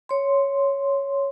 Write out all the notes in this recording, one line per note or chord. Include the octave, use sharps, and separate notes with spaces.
C#5 C6